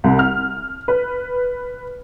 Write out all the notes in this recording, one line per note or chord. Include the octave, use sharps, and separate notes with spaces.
C2
F6
B4